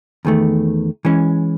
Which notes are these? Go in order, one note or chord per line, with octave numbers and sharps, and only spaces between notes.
E2 D#3 A3
E3 G#3 C#4